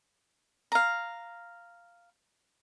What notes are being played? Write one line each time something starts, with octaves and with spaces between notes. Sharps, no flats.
F5 A#5